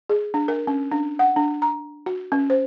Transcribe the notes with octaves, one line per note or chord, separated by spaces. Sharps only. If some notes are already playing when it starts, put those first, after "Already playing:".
G#4
D4
A#4
C#4
D4
F#5
D4
A#5
F#4
C#4
C5